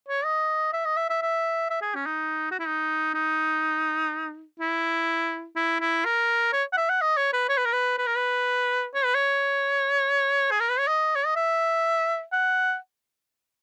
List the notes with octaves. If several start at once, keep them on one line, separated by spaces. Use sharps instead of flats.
C#5
D#5
E5
D#5
E5
E5
E5
E5
G#4
C#4
D#4
F#4
E4
D#4
D#4
E4
E4
E4
A#4
C#5
F#5
E5
F#5
D#5
C#5
B4
C#5
B4
A#4
B4
B4
A#4
B4
C#5
B4
C#5
G#4
A#4
B4
C#5
D#5
C#5
D#5
E5
F#5